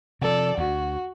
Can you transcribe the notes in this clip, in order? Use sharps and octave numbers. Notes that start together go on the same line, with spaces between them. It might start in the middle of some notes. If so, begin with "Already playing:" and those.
C3 F3 A4 D5
D2 F#4